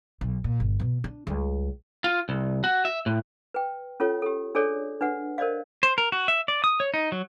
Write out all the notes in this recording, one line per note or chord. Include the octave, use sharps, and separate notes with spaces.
B1
A#2
G1
B2 B3
D4
C#2 G3
F4
C2
F#4
E5
A2
B4 G5
C#4 F4 A4 C#5
G4 A4
D4 G#4 A4 C#5 D5
D4 B4 F#5
A#4 C5 D5 D#5 F5
C5
A#4
F#4
E5
D5
D#6
C#5
D#4
F#3